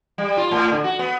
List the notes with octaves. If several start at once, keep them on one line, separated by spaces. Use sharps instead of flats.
G3
F4
A2
D3
F#4
B3